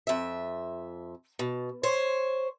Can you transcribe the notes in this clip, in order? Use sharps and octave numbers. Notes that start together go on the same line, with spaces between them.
F2 E5
B2
C5 C#5